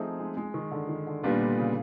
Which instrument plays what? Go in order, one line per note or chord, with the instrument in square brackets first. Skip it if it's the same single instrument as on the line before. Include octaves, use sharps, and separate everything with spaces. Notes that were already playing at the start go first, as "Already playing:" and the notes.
Already playing: [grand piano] F3 A3 C4 D#4 G#4
[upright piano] G#3
G#3
D#3
D3
D#3
D3
[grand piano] A#2 G3 B3 D4 F4 [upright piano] D#3
[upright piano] D3
C#3